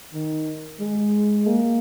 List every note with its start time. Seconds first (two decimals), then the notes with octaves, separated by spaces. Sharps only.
0.14 D#3
0.80 G#3
1.47 A#3